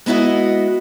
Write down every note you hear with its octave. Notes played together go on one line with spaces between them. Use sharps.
G#3 B3 E4 F#4 D#5